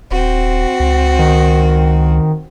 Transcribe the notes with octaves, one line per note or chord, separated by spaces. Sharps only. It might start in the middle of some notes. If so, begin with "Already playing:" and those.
D#1 C4 F#4
C#2
D#3